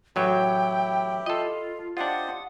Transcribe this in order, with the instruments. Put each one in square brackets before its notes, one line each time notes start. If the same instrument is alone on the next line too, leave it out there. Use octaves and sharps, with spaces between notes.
[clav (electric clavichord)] A1 F#3 C#5 [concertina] E4 G4 [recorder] G5
[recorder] F4 [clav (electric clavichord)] A4 D#5
[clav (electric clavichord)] D4 F4 [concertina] G4 C5 D#5 [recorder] F#5